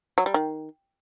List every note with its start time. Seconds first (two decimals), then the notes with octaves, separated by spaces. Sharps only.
0.18 F#3
0.26 G3
0.34 D#3